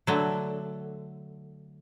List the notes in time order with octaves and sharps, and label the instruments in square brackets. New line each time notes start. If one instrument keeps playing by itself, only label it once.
[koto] D3 F#3 A3